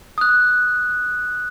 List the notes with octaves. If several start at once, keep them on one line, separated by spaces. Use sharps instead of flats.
D#6 F#6